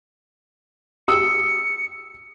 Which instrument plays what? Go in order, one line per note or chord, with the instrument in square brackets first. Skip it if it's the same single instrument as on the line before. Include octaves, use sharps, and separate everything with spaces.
[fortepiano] D#6 E6 [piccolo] C#7